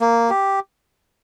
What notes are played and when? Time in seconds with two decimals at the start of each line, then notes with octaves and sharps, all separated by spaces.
0.01 A#3
0.30 G4